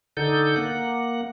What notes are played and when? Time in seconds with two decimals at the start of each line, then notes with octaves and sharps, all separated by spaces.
0.17 D3 D#4 A4 G6
0.56 A#3 F#5